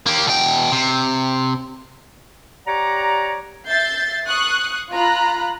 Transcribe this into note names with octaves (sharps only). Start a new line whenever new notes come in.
A#3 G4
B2 G5
C3
G4 C#5 D5 F#5 A#5
E5 G6 A6 C7
C#6 D#6 F#6 C7
F4 A#5 B5 F#6